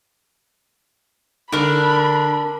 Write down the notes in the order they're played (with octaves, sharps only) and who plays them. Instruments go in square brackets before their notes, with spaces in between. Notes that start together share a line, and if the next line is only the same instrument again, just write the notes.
[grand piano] D3 [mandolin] D4 A#4 [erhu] B5